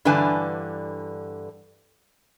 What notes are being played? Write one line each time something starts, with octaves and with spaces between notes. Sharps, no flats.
G2 D3 E3 B4 G#5 A5